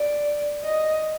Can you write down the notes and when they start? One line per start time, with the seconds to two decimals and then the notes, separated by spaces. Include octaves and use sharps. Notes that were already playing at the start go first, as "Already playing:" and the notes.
Already playing: D5
0.64 D#5